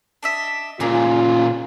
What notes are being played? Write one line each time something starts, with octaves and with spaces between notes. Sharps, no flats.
D4 D#5 E5
A#2 C#3 F4 G#4 A#4 D6